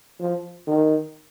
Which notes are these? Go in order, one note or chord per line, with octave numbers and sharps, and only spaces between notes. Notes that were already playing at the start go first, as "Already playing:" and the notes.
F3
D#3